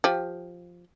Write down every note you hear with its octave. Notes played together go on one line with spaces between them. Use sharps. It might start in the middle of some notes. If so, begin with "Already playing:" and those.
F3 G4